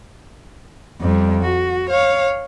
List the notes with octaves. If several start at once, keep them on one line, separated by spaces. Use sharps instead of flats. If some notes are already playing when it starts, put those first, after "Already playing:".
F2 G3
F#4
C#5 F5